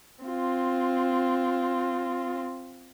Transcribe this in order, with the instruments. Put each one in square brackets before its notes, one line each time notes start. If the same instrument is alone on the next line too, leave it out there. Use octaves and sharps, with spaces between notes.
[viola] C4 F4